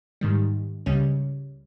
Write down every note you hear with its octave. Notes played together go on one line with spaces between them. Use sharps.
G#2 D#3 G3
C#2 C#3 G3 C#4